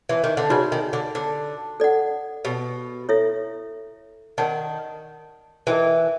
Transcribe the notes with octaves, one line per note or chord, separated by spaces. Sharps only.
E3
D#3
D3
C#3 D#4 F#4 B4 D5
D#3
D3
D3
A4 D5 F#5
B2
E4 A4 C#5 E5
D#3 A#4 D5 F#5 A5
E3 A#4 D#5 G5